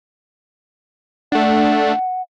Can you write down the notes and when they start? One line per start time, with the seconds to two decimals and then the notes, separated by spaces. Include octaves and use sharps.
1.32 A3 D4 F#5